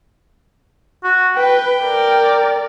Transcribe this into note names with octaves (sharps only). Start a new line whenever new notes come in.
F#4
B4 G5
A#4 D5